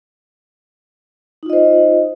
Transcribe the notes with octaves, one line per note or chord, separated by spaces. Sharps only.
D#4 F4 C5 D#5